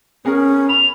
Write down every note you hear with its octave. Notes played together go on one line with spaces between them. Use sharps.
B3 C#4 G#4 A#4
B5 F7